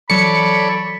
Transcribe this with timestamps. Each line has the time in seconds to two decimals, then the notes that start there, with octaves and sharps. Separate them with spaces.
0.10 E3 F#3 A4 C#5 D5 B5 C#7